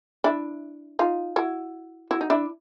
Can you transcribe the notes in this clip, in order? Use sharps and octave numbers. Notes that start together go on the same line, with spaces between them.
D4 E4
D#4 F4
E4 F#4
E4 F#4
D#4
D4 E4